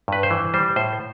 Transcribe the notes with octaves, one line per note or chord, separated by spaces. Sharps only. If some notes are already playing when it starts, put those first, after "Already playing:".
G2 B4
C5
E3
G3 C5
A2 C5